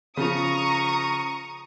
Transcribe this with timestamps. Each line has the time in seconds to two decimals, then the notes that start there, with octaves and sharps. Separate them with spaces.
0.17 C#3 F3 A#5 C#6 D#6